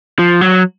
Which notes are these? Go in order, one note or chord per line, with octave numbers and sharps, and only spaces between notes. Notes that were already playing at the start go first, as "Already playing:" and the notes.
F3
F#3